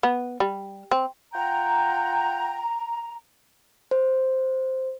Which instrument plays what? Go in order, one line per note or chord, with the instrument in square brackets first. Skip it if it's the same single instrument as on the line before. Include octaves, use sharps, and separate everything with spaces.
[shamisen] B3
G3
C4
[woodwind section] F4 F#5 G5 [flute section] A#5
[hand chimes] C5